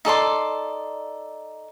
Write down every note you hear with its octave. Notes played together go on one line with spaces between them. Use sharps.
D#4 A4 D5 C6